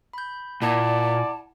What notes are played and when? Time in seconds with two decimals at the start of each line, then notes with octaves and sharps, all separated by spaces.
0.13 B5 G6
0.62 A#2 E4 D5 F#5 A5 G#6